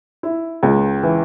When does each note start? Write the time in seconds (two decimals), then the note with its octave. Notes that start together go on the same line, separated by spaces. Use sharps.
0.23 E4
0.63 C#2
1.03 E3